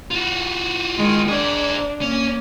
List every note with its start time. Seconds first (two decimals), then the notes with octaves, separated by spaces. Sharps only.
0.11 F4 F#4
0.97 D#3 G#3
1.28 D4 G#4 C5
2.01 A#3 C#4